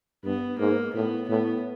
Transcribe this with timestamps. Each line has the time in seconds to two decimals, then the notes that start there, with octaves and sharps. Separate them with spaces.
0.24 G2 B3
0.58 G#2 A#3
0.94 A2 B3
1.28 A2 B3